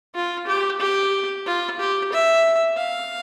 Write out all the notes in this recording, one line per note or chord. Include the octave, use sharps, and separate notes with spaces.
F4
G4
G4
F4
G4
E5
F5